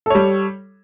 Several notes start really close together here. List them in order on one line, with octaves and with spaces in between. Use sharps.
A4 C#5 G3